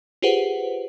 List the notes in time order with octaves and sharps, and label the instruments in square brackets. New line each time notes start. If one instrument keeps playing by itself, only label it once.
[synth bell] F4 G4 G#4 B4 C5 F#5